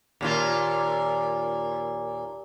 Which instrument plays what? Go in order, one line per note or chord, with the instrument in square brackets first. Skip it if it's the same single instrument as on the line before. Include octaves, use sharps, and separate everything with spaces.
[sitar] D#2 A#2 F4